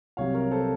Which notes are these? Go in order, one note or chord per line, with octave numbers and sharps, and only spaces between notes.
C2 C3 F#3 C#5 F5
A#4 C#5
A4 C5